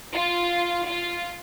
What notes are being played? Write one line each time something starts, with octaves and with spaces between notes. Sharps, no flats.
F4
F4